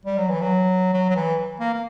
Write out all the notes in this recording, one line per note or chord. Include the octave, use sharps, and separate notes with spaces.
G3
F#3
E3
F#3
F#3
F#3
E3
A#3
A#3